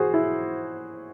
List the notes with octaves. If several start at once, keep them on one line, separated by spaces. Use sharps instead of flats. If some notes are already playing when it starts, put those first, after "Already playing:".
Already playing: E3 F#4 G#4 C5
E4